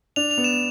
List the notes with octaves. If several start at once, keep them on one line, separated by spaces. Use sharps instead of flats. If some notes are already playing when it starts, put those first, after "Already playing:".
D4 F7
F7
B3
E7